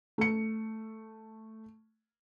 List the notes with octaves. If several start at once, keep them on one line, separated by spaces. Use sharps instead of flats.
A3 C#7